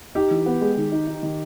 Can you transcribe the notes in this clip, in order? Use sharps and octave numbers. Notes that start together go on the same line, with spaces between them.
D#4 G4
E3
B3
G#3
D#3
D#4
D#4
D#3